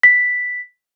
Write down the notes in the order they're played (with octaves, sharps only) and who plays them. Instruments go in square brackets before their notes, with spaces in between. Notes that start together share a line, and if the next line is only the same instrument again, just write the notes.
[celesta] B6